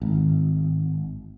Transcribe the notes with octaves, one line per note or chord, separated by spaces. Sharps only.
G#1